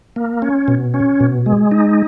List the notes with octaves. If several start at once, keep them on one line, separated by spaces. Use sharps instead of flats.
A#3
C#4
B2
C#4
B2
G#3
D#4